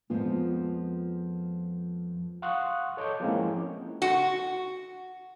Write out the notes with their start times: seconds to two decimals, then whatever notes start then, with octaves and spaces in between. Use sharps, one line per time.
0.10 F2 F3 G#3 B3 F4
2.42 F5 F#5 C6 C#6 D#6 F#6
2.97 A4 C#5 D#5 A5 D6 G6
3.20 F3 G#3 A#3 C4 C#4 E4
4.02 F#4